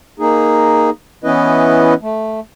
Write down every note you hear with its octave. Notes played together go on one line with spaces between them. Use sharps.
A#3 D#4 G#4
E3 B3 C#4 E4 B4 D#5
A3